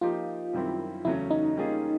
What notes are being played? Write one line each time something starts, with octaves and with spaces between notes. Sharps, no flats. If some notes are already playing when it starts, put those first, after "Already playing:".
F3 A#3 D#4 F4 G4
F#2 D#3 G3 C4 E4
E2 C#3 F#3 A3 C#4 E4
D#4
G3 A#3 C#4 F4 G#4